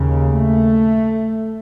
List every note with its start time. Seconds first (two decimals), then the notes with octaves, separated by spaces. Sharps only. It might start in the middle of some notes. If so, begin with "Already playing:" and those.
Already playing: D#2 C#3
0.30 A3